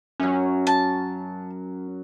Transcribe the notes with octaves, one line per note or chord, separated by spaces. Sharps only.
F#2 F#3 C#4
A5